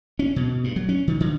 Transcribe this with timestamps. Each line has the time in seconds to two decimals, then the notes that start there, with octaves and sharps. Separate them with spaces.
0.19 C#4
0.36 B2
0.64 G2
0.76 F#3
0.89 C#4
1.07 D#3
1.20 D3